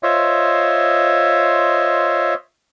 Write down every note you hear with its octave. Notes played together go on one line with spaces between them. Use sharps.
F4 C5 C#5 D#5 E5